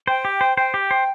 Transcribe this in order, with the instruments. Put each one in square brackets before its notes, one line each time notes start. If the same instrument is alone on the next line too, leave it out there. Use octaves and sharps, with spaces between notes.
[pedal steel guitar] C5 [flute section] G5
[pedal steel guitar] G4
C5
[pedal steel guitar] C5 [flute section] G5
[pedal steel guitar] G4
C5